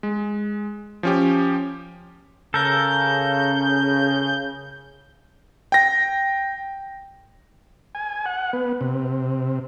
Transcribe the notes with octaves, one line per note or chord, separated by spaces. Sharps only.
G#3
F3 C#4 G4
C#3 A4 A#4 G6
G5 A#6
G#5
F#5
B3
C3